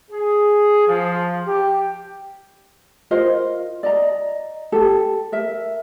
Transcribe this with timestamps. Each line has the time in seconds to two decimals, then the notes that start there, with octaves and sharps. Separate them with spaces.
0.11 G#4
0.87 F3
1.46 G4
3.11 F4 A#4 C5 D#5
3.83 D5 D#5 A#5
4.72 G4 A4
5.32 A#4 E5